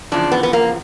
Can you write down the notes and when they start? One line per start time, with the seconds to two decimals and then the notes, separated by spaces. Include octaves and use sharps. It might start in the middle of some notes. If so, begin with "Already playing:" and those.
0.12 E2 C#3 F3 D4
0.32 B3
0.43 B3
0.53 A#3